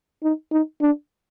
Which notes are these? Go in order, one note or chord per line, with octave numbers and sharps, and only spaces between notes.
D#4
D#4
D4